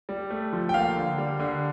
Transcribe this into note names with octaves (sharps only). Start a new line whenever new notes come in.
G3
A3
F3
G5
A#3 F5
D3
G3
D3